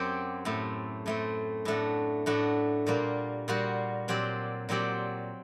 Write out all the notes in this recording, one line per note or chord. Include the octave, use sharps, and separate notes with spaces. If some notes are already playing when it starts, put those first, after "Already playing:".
Already playing: F#2 F#3 C4 G4
A2 A3 C4
A2 A3 C4
A2 A3 D4 F#4
A2 A3 D4 F#4
A#2 G3 A#3 F#4
A#2 G3 A#3 F#4
A#2 F#3 C4 G4 D5
A#2 F#3 C4 G4 D5